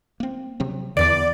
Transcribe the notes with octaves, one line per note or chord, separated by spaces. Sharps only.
A#3 C4
C3 F#3 C4
E2 D3 E3 D5 D6 A6 D7